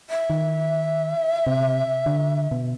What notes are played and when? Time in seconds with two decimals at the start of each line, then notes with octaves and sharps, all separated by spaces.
0.10 E5
0.30 D#3
1.47 C3
2.06 D3
2.51 B2